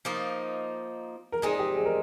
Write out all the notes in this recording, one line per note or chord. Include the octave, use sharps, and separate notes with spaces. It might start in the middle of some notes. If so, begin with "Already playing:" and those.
F3 A#3 D#4
A#4
A#2 G#3 C4 D#4 G#4
G4
G#4
A#4